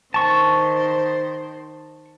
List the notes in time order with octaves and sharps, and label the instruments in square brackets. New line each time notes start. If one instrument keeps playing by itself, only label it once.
[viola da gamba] D#3 C5 [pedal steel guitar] A5 C#6